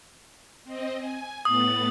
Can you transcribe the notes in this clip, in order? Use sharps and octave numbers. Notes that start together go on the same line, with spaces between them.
C4 D#5
G#5
A2 B3 D#6 A6